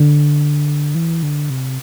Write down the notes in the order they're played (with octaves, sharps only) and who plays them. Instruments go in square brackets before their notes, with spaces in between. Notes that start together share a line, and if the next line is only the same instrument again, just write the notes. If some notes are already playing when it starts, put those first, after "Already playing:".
Already playing: [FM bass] D3
E3
D3
C3